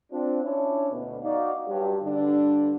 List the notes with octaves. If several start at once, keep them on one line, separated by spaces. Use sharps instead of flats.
C4 D4 F4
C#4 D4 E4 C#5
D2 B2
D#4 F#4 D5 F5
G2 F#3 G4
G2 D3 D4